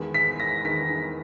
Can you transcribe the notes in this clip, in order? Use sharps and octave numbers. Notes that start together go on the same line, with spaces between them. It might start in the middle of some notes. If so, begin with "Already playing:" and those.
Already playing: E2 D#3 G#3
B6
A#6
E2 D#3 G#3 B6